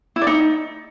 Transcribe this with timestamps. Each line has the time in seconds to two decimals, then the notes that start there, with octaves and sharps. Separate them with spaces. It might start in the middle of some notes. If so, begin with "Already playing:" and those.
0.16 E4
0.21 D5
0.27 D#4